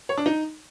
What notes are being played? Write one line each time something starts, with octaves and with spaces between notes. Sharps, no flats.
C#5
D4
D#4